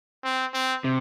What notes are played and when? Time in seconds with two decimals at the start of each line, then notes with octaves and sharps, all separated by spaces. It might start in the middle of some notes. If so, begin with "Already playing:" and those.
0.24 C4
0.54 C4
0.84 C3